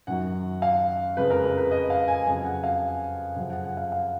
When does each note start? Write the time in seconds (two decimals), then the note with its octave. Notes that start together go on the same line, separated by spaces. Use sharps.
0.07 F#2 D#3 F#3 F#5
0.62 F5
1.17 F2 C#3 G#3 B4
1.30 A#4
1.45 A#4
1.58 B4
1.71 D#5
1.90 F5
2.08 G#5
2.27 F2 C#3 F#3 G#5
2.44 F#5
2.64 F5
3.36 F#2 C#3 F3 F#5
3.50 F#5
3.64 F#5
3.77 F5
3.92 F5